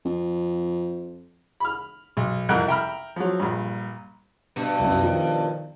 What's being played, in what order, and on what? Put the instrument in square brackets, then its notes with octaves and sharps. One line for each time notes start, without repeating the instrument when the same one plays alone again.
[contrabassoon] F2
[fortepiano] B5 F6
B1
C2 F2 A#4 G5 F#6
E5 G5 A#5 B5 F6
F3 F#3
A#1 G2
[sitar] G2 B2
[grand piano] C2 F#2
D#3 F3